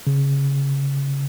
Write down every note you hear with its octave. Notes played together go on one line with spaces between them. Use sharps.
C#3